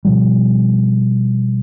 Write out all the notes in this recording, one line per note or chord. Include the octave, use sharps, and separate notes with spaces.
B2 F3 G3